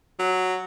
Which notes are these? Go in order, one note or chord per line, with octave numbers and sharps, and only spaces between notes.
F#3